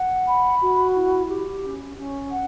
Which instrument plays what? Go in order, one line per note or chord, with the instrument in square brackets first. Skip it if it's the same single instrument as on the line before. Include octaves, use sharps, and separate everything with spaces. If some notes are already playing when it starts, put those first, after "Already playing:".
Already playing: [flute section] F#5
B5
F#4
E4
G4
C#4
C#4
F#5